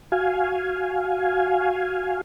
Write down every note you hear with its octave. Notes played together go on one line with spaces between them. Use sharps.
F#4 F5 G#5